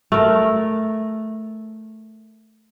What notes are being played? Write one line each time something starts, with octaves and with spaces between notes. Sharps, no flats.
A3 A#4